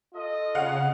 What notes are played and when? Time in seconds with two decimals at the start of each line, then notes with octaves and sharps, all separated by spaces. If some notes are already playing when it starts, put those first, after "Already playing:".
0.14 F4 A4 D#5
0.55 C#3 F5 F#5